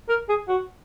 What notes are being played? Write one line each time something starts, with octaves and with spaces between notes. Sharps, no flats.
A#4
G#4
F#4